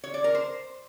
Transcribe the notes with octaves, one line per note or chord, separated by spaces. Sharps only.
C#5
D5
A#4
C5